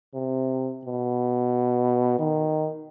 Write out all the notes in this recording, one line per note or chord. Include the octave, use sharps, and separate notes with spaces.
C3
B2
D#3